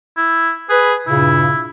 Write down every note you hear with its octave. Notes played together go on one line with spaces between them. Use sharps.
E4
G#4 B4
G2 A#2 C#3 E4